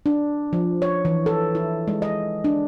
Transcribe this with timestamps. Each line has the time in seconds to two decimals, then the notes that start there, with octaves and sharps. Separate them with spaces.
0.06 D4
0.53 F3
0.82 C#5
1.05 E3
1.26 A4
1.55 E4
1.88 G#3
2.02 D#5
2.44 D4